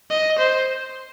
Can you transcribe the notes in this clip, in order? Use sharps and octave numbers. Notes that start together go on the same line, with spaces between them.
D#5
C5